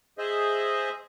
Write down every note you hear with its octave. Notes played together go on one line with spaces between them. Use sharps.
G#4 C5 D#5 E5